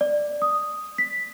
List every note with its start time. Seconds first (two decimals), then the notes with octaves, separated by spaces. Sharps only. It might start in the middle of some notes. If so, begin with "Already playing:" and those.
0.01 D5
0.42 D#6
0.98 B6